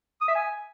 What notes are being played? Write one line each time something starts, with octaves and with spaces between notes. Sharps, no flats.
D#6
E5
G#5